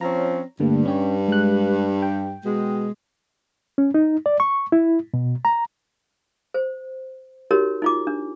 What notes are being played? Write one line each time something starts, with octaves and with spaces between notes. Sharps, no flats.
F3 C4 C#4 C#5 A#5
G2 D3 A3 A#3
C#4 G4 C#5
G#3 F#6
G5
B2 G#3
C#4
D#4
D5
C#6
E4
B2
A#5
C5
D#4 F#4 G4 A#4 C#5
D#4 F4 D6
D4